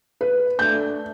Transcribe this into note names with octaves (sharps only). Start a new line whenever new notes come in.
B4
A3 D4 G6